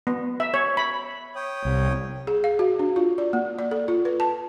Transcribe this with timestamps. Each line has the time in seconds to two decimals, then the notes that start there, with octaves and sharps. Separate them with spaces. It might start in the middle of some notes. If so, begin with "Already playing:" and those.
0.07 B3
0.40 E5
0.54 C#5
0.77 B5
1.36 C#5 G5 D#6
1.65 C2
2.27 G#4
2.44 F5
2.59 F#4
2.79 D4
2.96 F4
3.18 D5
3.33 A#3
3.59 D5
3.71 A4
3.88 F4
4.05 B4
4.20 A5